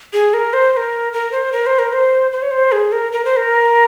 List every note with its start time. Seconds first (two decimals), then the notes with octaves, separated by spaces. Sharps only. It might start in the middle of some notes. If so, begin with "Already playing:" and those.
0.13 G#4
0.34 A#4
0.53 C5
0.73 C5
0.77 A#4
1.13 A#4
1.32 C5
1.52 A#4
1.66 C5
1.79 A#4
1.93 C5
2.32 C5
2.42 C#5
2.51 C5
2.72 G#4
2.92 A#4
3.12 A#4
3.25 C5
3.37 A#4